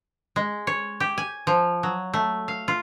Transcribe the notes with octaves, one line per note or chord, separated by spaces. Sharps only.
G#3
C#5
G4
G#5
F3
F#3
A3
F5
F4